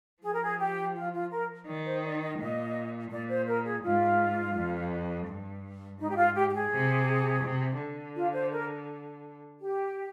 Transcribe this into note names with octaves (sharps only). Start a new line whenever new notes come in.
F3 G#4
A#4
G#4
G4
F4
F4
A#4
D#3 D5
C5
D5
D#5
A#2 D#5
A#2 D5
C5
A#4
G#4
G#2 F4
F2
G2
G#2 D#4
G4
F4
G4
G4
G#4
C3
C3
D3
F4
C5
A#4
G4